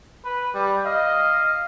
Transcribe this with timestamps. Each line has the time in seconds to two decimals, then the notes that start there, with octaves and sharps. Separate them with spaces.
0.24 B4
0.54 G3
0.86 D#5 F5